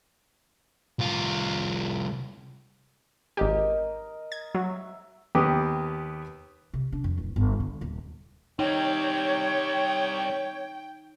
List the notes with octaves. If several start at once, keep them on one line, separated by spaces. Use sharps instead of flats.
C2 F4
G#1 G4 A#4 D#5
G#6
F#3 E5
D#2 B3 G4 D#6
C3
D4
F2
D1
G1
D3
D#1
G3 C4 D#4 C#5 G5